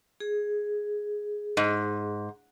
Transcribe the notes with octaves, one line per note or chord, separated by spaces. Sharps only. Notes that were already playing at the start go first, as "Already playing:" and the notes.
G#4
G#2